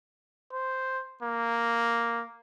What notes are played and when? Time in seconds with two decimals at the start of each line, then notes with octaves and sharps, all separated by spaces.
0.53 C5
1.23 A#3